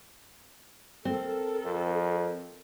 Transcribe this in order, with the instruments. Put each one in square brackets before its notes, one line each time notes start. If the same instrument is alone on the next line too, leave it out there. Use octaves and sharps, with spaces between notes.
[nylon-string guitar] C4 [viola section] A4 A#4
[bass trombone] F2